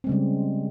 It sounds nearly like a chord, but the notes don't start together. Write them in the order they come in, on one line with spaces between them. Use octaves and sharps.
C4 G#3 C#3 G3